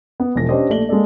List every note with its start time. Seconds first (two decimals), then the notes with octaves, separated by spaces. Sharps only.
0.20 B3
0.36 E1 F3 A#6
0.49 C#4 D4 G4 C5 D#5
0.70 A#1 A3 D5 F#7 G7
0.89 G#3 A#3 A4 D5